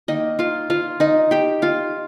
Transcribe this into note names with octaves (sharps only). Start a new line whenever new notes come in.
D#3 A#3 D#4 D#5
F4 F5
F4 F5
D#4 D#5
G4 G5
F4 F5